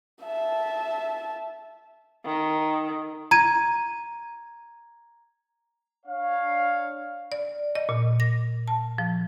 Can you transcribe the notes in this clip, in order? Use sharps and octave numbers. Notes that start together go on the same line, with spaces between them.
E5 A5
D#3
A#5 G#6 D#7
D4 C#5 F5
D5
D#5
A#2
A#6
A5
F3